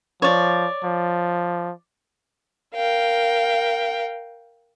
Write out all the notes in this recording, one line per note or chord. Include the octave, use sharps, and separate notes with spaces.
F3 C#5 D5
F3
A#4 F5 G5